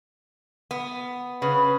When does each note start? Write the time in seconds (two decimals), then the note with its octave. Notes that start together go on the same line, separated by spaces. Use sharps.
0.71 B3
1.42 C#3 B4